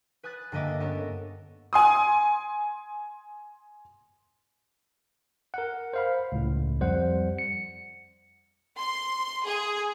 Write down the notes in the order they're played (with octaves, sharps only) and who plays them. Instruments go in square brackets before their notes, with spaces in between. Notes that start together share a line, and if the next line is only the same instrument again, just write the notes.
[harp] B4 G#5 D#6 F#6 A6
G2 D3 A#3 D#5 E5 D6
B3 C#4 A4 A#4 D#5
[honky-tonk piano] G#5 C6 D#6
[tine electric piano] A#4 F#5
C5 F5 B5
C#2 A2
F2 G3 C5 F#5
C#7
[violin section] C6
G#4